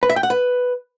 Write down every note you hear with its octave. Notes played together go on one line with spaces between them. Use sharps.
B4
E5
G5
F#5
B4